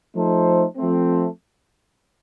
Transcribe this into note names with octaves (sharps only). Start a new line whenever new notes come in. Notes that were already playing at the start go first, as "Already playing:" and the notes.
F3 A3 D#4 A4 C5
F3 A3 C4